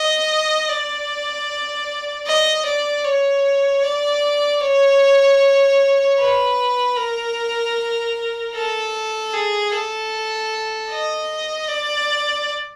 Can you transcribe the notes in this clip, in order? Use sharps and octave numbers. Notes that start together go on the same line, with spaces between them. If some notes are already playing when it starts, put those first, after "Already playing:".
Already playing: D#5
D5
D#5
D5
C#5
D5
C#5
B4
A#4
A4
G#4
A4
D#5
D5